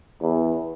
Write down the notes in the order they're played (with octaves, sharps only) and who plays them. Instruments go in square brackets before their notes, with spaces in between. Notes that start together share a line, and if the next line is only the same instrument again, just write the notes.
[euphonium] E2